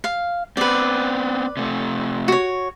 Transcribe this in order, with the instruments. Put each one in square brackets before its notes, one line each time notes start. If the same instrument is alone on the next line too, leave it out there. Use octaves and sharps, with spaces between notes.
[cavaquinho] F5
[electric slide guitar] B3 C4 [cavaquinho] B4 D5
[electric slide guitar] C3 A3
[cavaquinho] F#4 C#5